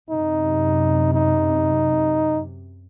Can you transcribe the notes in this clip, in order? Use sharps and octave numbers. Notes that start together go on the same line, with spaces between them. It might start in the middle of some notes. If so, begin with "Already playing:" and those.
F#2 C3 D#4
D#4